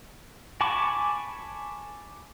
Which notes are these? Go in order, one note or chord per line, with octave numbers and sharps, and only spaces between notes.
G#5 A5 B5 C#6 D6